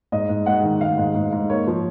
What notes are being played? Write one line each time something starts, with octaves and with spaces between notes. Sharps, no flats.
G#2 D#5
G#2
G#2 F#5
D#3
D#3 F5
G#2
G#2
G#2
A#3 C#5
F3